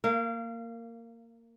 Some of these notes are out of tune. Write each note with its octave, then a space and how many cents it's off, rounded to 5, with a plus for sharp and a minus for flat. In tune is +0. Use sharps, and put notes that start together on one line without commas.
A#3 -15 F5 -35